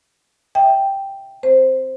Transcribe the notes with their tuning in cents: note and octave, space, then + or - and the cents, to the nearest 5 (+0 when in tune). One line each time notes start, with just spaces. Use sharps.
E5 -5 G5 +0
C4 +0 C5 +0